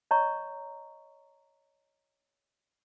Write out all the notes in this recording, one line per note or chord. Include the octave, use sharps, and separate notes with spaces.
C#5 D#5 A#5 C#6